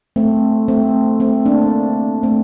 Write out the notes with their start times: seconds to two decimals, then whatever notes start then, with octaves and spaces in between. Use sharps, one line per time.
0.16 A3 C4
0.68 A3 C4
1.20 A3 C4
1.46 A#3 D4
2.23 A3 C4